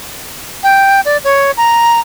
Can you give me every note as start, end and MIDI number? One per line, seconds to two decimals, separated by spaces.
0.63 1.01 79
1.05 1.17 74
1.24 1.51 73
1.57 2.00 82